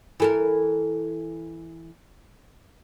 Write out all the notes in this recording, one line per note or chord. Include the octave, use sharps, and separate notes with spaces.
E3 A4 A#4